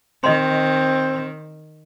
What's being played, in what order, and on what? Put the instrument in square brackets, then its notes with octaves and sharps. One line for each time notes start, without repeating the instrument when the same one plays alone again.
[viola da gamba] D#3 [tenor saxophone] C4 [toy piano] D#5 C6